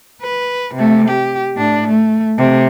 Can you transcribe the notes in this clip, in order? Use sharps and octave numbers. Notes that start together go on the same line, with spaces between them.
B4
C3 A3
G4
A2 D4
A3
C3 A3